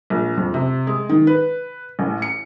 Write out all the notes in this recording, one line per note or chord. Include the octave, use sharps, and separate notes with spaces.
A#1
F2
C3
G#3
D#3
B4
A1
C#7